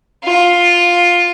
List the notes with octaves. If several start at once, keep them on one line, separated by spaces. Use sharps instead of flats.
F4